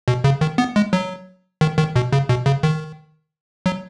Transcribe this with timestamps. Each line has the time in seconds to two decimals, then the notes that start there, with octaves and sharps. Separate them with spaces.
0.08 B2
0.24 C#3
0.41 D#3
0.58 B3
0.76 G#3
0.93 F#3
1.61 D#3
1.79 D#3
1.96 B2
2.13 C#3
2.29 B2
2.46 C#3
2.63 D#3
3.66 F#3